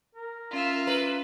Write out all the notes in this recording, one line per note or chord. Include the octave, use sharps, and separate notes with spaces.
A#4
C#4 F4 E5 F5
A#3 B4